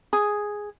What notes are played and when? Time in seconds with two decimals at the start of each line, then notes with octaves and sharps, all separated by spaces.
0.13 G#4